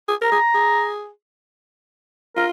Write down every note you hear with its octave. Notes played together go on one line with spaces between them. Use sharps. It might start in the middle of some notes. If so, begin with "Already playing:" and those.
G#4
A#4 A#5
G#4
G#4
F4 A#4